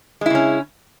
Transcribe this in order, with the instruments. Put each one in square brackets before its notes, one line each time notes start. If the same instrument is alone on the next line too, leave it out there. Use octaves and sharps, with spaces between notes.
[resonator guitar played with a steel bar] G#3
E4
C#3
C#4